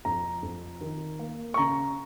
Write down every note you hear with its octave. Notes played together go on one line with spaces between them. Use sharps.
F2 A#5
F2
D#3
A#3
C#6
C#3 A#5